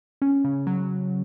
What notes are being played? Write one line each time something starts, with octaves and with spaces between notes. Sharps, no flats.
C#4
C#3
F#3